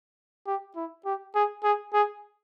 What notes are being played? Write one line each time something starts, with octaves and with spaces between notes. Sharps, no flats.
G4
E4
G4
G#4
G#4
G#4